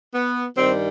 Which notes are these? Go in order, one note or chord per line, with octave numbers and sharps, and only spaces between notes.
B3
G2 D#3 G3 C4